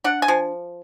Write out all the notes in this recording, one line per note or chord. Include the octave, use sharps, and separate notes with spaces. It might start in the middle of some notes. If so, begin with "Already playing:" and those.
D4 F#5
G#5
F3